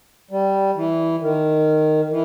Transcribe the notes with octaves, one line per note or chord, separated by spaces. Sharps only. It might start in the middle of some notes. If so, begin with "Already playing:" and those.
G3
E3
D#3
E3